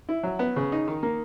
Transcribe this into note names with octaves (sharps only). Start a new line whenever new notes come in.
E4
F#3
B3
C#3
D#4
D#3
A#3